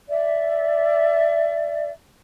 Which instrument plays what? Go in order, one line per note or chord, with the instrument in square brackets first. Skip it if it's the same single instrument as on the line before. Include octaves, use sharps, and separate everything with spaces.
[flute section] D5 E5